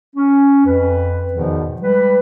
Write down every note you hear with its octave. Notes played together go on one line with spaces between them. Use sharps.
C#4
F2 B4
E2 G#2 B2 D#3 F3
G3 G#3 B4